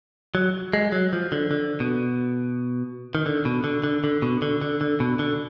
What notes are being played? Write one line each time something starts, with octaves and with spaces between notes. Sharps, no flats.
F#3
G#3
F#3
F3
D3
D3
B2
D#3
D3
B2
D3
D3
D3
B2
D3
D3
D3
B2
D3